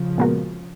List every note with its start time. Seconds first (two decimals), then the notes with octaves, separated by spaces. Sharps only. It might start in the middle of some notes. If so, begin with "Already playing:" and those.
Already playing: C#3 F3
0.18 A#2 G#3 B3 F#4 A#4